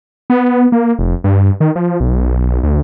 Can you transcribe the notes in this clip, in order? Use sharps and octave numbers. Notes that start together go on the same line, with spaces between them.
B3
A#3
F1
G2
D#3
F3
B1
D2